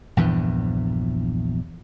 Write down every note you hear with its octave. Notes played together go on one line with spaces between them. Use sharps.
A#1 E2 G2 E3